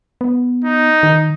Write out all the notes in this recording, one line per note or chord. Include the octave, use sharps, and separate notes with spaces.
B3
D#4
D#3